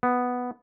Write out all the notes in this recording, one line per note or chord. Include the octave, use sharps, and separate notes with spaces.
B3